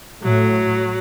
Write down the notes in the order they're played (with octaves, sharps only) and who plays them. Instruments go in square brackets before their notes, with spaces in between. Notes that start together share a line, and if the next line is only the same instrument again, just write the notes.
[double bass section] A2 [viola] F#3